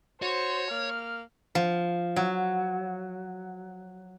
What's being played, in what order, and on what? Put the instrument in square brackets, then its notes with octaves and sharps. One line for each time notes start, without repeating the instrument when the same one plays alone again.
[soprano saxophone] F#4 [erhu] C5 [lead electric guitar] C#5
[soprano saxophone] A#3 [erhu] F6
[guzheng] F3
F#3